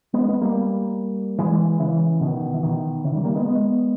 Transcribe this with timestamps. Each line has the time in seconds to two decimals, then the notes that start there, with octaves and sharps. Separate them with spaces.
0.14 G#3 B3
0.28 G#3 B3
0.41 G3 A#3
1.38 E3 G#3
1.80 C#3 E3
2.21 B2 D#3
2.54 E3
2.63 B2 D#3
3.04 C#3 E3
3.14 D#3 G3
3.24 G3 A#3
3.35 G#3 B3
3.46 G#3 B3